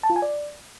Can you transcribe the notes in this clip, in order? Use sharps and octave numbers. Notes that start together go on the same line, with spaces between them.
A5
F4
G#5
D5